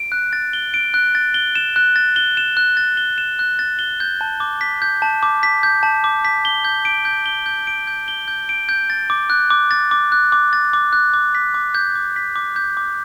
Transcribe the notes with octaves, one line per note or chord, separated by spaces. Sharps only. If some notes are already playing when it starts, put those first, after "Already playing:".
Already playing: D7
F#6
A6
G7
D7
F#6
A6
G7
E7
F#6
A6
G7
E7
F#6
A6
G7
E7
F#6
A6
G7
G6
A5
D6
B6
G6
A5
D6
B6
G6
A5
D6
B6
G7
G6
D7
G6
G7
G6
D7
G6
G7
G6
D7
G6
A6
D6
F#6
D6
A6
D6
F#6
D6
A6
D6
F#6
D6
B6
D6
G6
D6
B6
D6
G6
D6